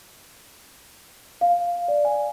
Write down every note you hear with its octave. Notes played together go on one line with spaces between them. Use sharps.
F5
D5
G#5